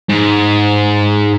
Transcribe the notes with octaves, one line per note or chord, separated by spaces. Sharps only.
G#2